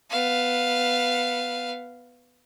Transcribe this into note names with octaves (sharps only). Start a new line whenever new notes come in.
B3 F5